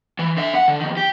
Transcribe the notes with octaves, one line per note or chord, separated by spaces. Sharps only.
E3
D3 E5
F#5
D3
F2 D#3
G4